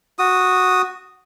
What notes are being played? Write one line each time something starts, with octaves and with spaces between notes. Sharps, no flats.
F#4 D#6